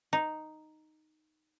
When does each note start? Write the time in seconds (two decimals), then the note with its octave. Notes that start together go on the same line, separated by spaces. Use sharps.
0.13 D#4